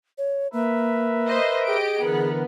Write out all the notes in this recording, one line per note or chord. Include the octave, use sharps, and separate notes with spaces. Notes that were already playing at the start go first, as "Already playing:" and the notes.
C#5
A#3 A#4 B4 E5
C5 D#5
G4 G#4 D#5 D7
D3 E3 B3 A#4